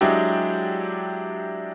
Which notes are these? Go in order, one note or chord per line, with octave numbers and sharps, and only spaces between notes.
F#3 G#3 D4 E4 G4